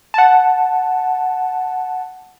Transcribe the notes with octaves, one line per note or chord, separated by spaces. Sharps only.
F#5 A5